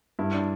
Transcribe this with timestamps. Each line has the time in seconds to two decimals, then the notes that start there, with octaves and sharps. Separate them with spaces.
0.19 G2 E4
0.34 D4